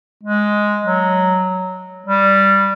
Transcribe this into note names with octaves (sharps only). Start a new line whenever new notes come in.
G#3
F#3
G3